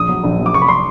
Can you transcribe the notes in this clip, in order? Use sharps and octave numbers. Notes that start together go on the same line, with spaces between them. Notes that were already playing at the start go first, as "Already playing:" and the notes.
Already playing: A#1 D#6
F#3
A#1
F#3
D6
F1 C#6
B5
C6